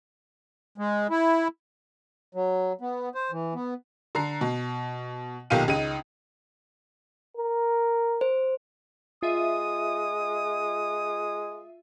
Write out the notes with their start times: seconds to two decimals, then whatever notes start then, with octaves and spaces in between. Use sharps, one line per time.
0.78 G#3
1.10 E4
2.35 F#3
2.81 B3
3.15 C5
3.31 E3
3.54 B3
4.15 D3 A#5 C7
4.41 B2
5.50 B1 A#2 D#3 G4 F5 D#7
5.68 C#2 C#3 D#4 D#7
7.37 A#4
8.21 C5
9.23 G#3 F4 E5 D#6 D#7